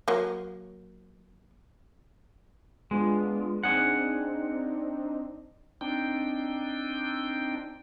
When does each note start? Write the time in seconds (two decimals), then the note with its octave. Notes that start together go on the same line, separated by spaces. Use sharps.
0.08 F#3 A#3
2.91 G#3 B3 D4 F4
3.63 C4 D4 D#4 G#4 F#5
5.81 C4 D4 D#4 G5